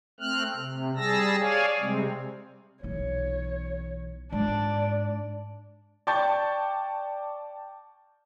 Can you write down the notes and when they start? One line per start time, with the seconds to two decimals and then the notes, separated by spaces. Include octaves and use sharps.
0.20 A3 C4 F6 F#6
0.56 C3
0.97 G3 G#4 A5 E6 A#6
1.40 G#4 C#5 D5 F5 G#5
1.80 C3 G3 G#3 C4
2.83 B1 E3 C#5
4.32 G#2 D4 D5
6.07 D5 G5 A5 C#6 G6 A6